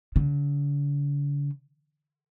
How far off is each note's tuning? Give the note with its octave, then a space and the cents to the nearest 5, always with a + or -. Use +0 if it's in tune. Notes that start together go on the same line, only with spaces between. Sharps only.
D3 -45